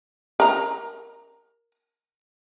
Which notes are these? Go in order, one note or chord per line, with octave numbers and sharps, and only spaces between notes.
A#4 A#5